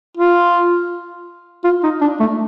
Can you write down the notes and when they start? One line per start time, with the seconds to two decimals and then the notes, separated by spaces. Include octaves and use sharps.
0.17 F4
1.64 F4
1.83 D#4
2.01 D4
2.20 A3